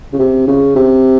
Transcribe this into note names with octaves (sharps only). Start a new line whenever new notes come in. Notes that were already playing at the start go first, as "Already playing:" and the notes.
C#3
C3
C#3
C3